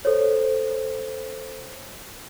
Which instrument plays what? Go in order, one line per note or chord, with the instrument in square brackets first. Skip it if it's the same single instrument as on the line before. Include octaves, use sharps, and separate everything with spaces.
[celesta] A4 C5 C#5